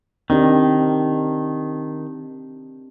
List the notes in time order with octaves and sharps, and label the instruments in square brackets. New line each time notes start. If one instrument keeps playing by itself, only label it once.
[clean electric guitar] D#3 [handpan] C4 D4 G4